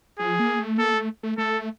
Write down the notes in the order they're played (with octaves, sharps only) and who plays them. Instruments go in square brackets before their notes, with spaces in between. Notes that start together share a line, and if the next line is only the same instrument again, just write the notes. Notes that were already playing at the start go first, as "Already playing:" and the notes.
[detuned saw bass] F3 [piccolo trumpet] G#4
[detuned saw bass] A#3
A3
[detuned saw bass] A#3 [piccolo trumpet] A4
[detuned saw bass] A3
A3
[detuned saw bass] A3 [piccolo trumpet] A4